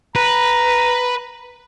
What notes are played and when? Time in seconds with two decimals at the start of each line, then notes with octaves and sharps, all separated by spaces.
0.16 B4 A#5